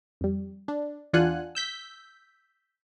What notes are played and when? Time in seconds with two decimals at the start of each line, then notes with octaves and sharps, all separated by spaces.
0.21 F2 G3
0.68 D4
1.13 E2 D4 F4 F#5 G#5 F#6
1.55 E6 G6 B6